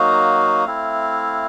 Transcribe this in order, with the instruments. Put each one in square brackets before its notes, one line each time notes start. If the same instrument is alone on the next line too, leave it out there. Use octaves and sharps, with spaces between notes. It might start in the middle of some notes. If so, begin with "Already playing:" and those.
Already playing: [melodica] F#3 A#3 D#4 F#4 F5
A3 C4 E4